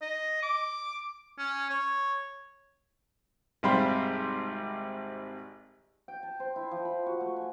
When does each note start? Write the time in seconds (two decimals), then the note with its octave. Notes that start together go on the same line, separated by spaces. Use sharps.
0.01 D#5
0.42 D6
1.38 C#4
1.70 C#5
3.63 G#1 C3 G3 C5 F5 B5
6.08 G5
6.23 A5
6.40 C5
6.56 E4
6.71 F3
6.85 B5
7.06 F#4
7.21 A3
7.37 G#5